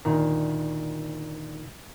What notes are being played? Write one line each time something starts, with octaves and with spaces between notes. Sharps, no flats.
D2 A#2 D#3